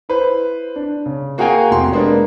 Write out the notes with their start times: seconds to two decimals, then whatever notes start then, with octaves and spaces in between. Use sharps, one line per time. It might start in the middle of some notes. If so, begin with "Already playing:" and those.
0.09 E4 B4 C5
0.76 D4
1.06 C#3
1.38 A#3 F#4 G#4 F5 G5 G#5
1.71 F1 C6
1.92 G#3 A#3 B3 D4